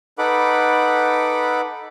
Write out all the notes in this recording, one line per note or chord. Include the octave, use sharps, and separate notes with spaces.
D#4 A4 B4 F#5 B5 D6